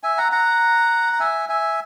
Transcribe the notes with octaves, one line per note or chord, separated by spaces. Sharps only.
E5 G#5
F#5 A#5
F#5 A#5
A#5
E5 G#5
E5 G#5